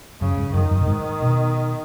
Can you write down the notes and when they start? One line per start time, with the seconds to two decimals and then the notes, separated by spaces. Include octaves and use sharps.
0.20 F#2 C#3
0.37 G#2
0.54 F#2 D#3
0.71 F#2
0.81 B2
0.87 G#2
1.22 B2